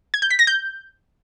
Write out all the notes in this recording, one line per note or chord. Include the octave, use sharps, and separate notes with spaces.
G#6
G6
B6
A#6
G6